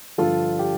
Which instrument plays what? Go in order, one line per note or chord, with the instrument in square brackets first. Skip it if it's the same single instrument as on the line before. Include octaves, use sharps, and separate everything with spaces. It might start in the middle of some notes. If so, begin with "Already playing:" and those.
[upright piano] G2 D3 F3 F4 A4
G4